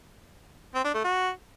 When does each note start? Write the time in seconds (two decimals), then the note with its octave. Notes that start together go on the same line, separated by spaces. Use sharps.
0.75 C4
0.84 D4
0.94 A3
1.04 F#4